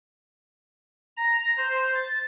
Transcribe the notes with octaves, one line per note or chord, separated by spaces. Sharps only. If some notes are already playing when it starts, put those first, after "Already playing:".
A#5
C5
A6